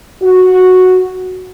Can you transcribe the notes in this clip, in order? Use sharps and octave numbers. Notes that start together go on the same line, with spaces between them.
F#4